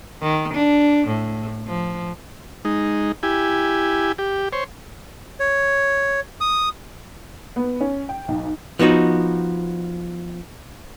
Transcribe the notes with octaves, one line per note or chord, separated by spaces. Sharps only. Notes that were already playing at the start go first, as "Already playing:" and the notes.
D#3
D4
A2
F3
G#3 D#4
E4 G4 G#5
G4
C5 C#5
C#5
D#6
B3
C#4
G5
B1
F3 B3 D#4 F#4